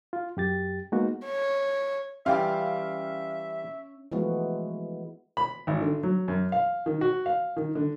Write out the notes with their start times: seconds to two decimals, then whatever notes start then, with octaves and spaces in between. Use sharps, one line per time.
0.13 F4
0.37 F#2 G4 A6
0.92 G#3 A#3 B3 D#4 F#4
1.26 C#5
2.26 E3 G3 C#4 F4 E5 F5 G5
4.12 E3 F3 G#3 A3 B3 F#4
5.37 B5
5.67 G#1
5.81 D3
6.03 F#3
6.28 F#2
6.52 F5
6.86 D#3
7.01 F#4
7.26 F5
7.57 D#3
7.75 D3